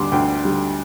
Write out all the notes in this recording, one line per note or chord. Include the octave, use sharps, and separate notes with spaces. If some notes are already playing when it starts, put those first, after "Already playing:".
Already playing: D2 D3 G3 C6 D6
D2 G5
D3 G3